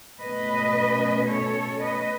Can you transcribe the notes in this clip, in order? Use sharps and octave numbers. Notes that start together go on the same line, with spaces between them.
B2 A3 C#4 B4 D#5
A4 C#5
B4 D#5